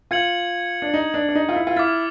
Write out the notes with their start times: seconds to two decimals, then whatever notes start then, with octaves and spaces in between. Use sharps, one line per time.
0.11 F4 G#6 C#7 F#7
0.82 D4
0.94 D#4
1.14 D4
1.29 D4
1.35 D#4
1.49 F4
1.56 E4
1.67 F4
1.76 E4 D6 F6 A6